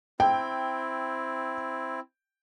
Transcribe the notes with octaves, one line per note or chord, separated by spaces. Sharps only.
C4 E4 G5